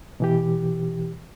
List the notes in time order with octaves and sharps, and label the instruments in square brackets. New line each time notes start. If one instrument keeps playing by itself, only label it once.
[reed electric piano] B2 E3 G4